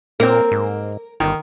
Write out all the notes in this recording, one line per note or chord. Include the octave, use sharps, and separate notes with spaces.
A#2 A#3 C4 A#4
G#2
G1 D#3